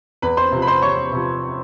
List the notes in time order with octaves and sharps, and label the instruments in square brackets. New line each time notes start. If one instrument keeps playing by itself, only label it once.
[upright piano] E2 B4 B5
C5 C6
C3 F3
B5
C5 C6
E2 C#5 C#6
C3 F3